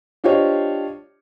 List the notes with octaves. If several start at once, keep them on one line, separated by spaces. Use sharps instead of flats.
D4 F4 G4 C5 C#5 D#5